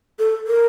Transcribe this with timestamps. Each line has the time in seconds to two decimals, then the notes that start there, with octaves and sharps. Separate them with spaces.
0.19 A4
0.47 A#4